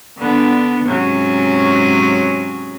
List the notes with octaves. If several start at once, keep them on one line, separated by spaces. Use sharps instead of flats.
D3 B3 D4
G#2 C3 F#3 C#4 G#4